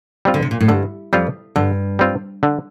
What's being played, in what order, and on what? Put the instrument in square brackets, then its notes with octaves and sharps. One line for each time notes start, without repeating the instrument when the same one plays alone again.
[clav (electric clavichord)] G3 C4 F4
[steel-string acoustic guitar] D3
C3
A#2
A2
[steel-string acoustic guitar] G2 [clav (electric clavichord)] D3
[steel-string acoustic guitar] F2 [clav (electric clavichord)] G3 C4 F4
[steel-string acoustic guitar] G2 [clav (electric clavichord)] D3
[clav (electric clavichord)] G3 C4 F4
D3